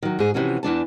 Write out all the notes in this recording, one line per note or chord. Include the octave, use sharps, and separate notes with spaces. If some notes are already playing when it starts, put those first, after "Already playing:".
D#3 F#3
G#2 G#4
C3 E3 F3 C#4 F#4
E2 E3 D4 A5